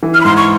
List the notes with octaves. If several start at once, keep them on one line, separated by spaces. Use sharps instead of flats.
E3
F6
B5
G#2 C6
C#6